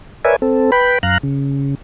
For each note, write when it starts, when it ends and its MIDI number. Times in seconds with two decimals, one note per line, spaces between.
0.25 0.36 70
0.25 0.36 71
0.25 0.36 73
0.25 0.36 74
0.25 0.36 76
0.25 0.36 80
0.42 0.71 60
0.42 0.71 69
0.72 0.98 71
0.72 0.98 79
0.72 0.98 83
1.03 1.18 42
1.03 1.18 77
1.03 1.18 82
1.03 1.18 90
1.23 1.75 49